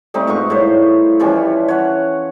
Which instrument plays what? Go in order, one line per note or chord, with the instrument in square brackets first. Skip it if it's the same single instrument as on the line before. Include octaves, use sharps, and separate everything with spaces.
[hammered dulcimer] G3 A3 C4 D#4
G#2 B2 F4 C#6
A2 G3 C5 C#5
E3 F3 G3 C#4
C#5 F#5